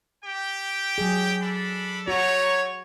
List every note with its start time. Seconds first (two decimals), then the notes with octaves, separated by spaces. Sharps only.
0.25 G4 G5
0.98 F#3 G#4
1.42 D4 A4 B5
2.08 A3 F#4 C#5 A#5